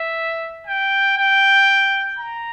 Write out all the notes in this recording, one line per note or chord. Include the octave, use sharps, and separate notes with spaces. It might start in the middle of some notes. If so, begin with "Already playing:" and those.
Already playing: E5
G5
G5
A#5